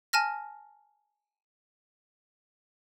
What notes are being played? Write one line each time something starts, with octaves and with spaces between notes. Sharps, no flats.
G#5 A5 F6 A#6